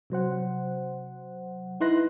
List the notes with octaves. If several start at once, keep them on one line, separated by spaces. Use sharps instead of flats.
C3 F#3 C5 F#5
D#4 E4 B4 C6 F#6 A#6